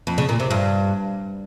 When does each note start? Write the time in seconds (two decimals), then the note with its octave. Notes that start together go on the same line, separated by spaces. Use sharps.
0.07 F2
0.18 C#3
0.29 A#2
0.40 C3
0.51 G2